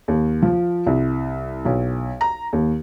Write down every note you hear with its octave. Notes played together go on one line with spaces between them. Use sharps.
D#2
F3
C2
B1
A#5
D#2